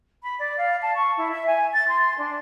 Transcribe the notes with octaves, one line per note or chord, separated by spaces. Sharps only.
B5
D5
F5
A5
C#6
E4
E5
G#5
A6
C6
D4